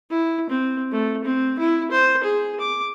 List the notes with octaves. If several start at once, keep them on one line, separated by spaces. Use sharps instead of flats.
E4
C4
A3
C4
E4
C5
G#4
D6